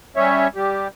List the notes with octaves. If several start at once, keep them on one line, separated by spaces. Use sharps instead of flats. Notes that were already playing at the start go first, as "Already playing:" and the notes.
G3 C#4 C#5 E5
G3 G4